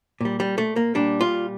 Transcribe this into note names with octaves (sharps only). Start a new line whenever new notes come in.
A#2 G3
G3
A3
A#3
A#2 G3 D4
F4